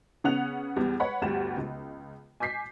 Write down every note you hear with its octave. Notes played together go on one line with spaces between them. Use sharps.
C#3 B3 C#4 F#5 F#6 F7
E2 G3 B3
B4 C#5 F#5 B5
G1 D2 G3 G4 F#5 E7
C#2
G#5 D6 G6 B6 C7